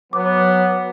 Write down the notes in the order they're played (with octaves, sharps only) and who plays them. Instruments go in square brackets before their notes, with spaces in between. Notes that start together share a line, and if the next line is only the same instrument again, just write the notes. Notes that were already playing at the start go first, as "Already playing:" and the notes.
[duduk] F#3 [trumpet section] B3 [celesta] D6